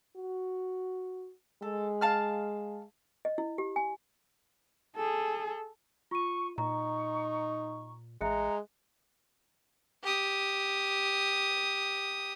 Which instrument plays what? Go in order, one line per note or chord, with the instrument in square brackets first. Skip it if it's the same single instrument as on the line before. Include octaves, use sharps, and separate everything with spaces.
[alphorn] F#4
[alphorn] G#3 [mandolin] A4
[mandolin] F5 A5 F6
[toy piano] D#5
E4
G4
G#5
[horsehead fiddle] G#4 A4
[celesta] F4 D#7 [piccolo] C#6
[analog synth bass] A#2 [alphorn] D#4 [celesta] A#5 [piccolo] C#6
[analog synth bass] A1 [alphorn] G#3 [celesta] E5 F#6 C#7 [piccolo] A#5
[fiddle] G4 D#6